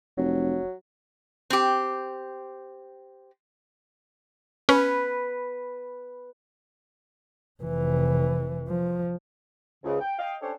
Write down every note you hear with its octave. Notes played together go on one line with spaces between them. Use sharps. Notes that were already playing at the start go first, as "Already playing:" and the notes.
F1 F#3
C4 G4
C#4 B4
F1 E3
F3
C#2 G#2 C#3
G5
D#5 F5 G5
C#4 D4 G4 A4 C5 C#5